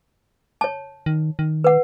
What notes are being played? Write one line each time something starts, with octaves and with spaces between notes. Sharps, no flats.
C#5 A5
D#3
D#3
B4 F#5